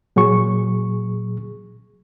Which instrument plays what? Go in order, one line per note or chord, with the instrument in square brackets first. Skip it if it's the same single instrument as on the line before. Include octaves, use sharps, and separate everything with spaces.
[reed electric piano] A#2 F#3 G#4 C#6